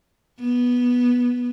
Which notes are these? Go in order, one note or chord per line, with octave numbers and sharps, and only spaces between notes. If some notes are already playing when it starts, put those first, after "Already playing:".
B3